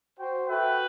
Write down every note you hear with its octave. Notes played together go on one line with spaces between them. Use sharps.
F#4 C5 G5
F#4 A4 B4 E5 G5